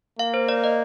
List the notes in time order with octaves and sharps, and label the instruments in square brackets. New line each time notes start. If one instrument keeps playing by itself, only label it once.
[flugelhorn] A#3 [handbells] F5
[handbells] C5
D5
D#5